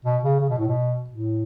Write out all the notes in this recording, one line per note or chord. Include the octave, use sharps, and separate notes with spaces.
B2
C#3
C#3
B2
A2
B2
A2